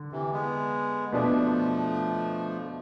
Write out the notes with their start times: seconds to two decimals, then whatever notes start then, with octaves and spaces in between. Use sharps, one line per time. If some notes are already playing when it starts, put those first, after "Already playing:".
Already playing: D3
0.12 C3 E3
0.32 G#3 B3
1.12 B2 F3 A3 B3 D4